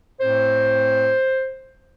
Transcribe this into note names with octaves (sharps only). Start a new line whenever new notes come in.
A2 A3 C4 C5